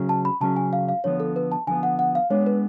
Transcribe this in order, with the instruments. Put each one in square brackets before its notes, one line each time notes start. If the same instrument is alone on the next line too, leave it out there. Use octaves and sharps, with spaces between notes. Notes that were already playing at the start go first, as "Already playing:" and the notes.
Already playing: [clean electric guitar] C#3 F#3 C#4 G#4
[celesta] A5
B5
[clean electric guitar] C#3 F#3 C#4 G#4 [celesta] A5
[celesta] G#5
F5
F5
[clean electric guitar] D3 F3 B3 [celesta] C#5
[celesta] A4
B4
A5
[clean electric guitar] D3 F3 B3 [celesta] G#5
[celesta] F#5
F#5
F5
[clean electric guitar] G#3 B3 D4 [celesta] C#5
[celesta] B4